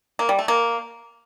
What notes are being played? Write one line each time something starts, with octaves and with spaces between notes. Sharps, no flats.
A#3
G3
A3
A#3